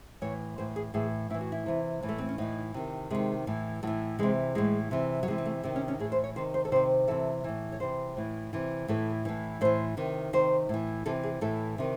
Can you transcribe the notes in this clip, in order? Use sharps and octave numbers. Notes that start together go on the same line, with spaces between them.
A2 E3 C#5
A2 E3 C5
G#4
A2 E3 G#4
A2 E3 E4
F#4
E4
C3 E3
A2 E3
A3
C4
C#4
A2 E3 D#4
C3 D#3
C3 D#3 G#3
A2 E3
A2 E3 F#3
C3 E3 G#3
A2 E3 G#3
C3 E3
F#3
C3 E3 G#3
C4
A3
C3 D#3 C4
C#4
C#4
A2 E3 G#4
C5
C#5
C3 D#3 C5
C5
A4
C3 D#3 C5
C3 E3 A4
A2 E3
C#5
C3 E3 C5
A2 E3
C3 E3
A2 E3 A4
A2 E3
A2 E3 C5
C3 D#3
C3 D#3 C5
A2 E3
C3 E3 A4
G#4
A2 E3 A4
C3 D#3